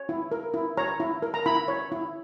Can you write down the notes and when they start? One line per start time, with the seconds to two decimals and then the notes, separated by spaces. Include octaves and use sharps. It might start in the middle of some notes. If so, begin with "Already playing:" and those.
Already playing: C#5
0.09 E4
0.32 A#4
0.54 E4
0.77 C#5 A#5
1.00 E4
1.22 A#4
1.34 A#5
1.46 E4 B5
1.68 C#5
1.92 E4